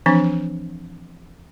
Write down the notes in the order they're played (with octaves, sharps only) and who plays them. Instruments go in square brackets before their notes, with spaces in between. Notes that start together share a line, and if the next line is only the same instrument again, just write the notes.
[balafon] E3 F3 C4 D4